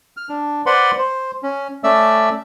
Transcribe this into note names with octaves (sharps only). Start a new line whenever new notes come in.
F6
D4
B4 C5 D5 F#5 B5 C6
C5
C#4
A3 C#4 D5 E5 E6